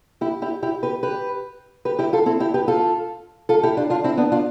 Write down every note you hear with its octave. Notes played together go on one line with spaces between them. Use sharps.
E4 G4
E4 G4
E4 G4
G4 B4
G4 B4
G4 B4
E4 G4
F4 A4
C4 E4
E4 G4
G4 B4
F4 A4
F4 A4
E4 G4
D4 F4
D4 F4
C4 E4
B3 D4
D4 F4